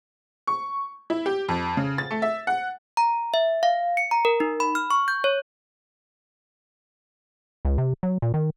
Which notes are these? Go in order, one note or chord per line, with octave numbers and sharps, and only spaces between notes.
C#6
E4
G4
F2
C#3
A6
A3
E5
F#5
A#5
E5
F5
C#7
A#5
A#4
D#4
B5
F6
C#6
G6
C#5
C#2
C3
F#3
A#2
D#3